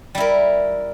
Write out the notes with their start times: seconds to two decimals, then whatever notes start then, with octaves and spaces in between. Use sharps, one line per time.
0.15 G3
0.18 E4
0.20 A#4